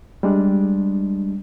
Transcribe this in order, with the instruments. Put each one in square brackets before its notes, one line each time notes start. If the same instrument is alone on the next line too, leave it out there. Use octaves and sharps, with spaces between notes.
[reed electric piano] G3 G#3 D4